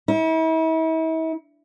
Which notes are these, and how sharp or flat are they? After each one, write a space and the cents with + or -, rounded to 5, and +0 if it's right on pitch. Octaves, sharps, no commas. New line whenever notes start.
E4 -40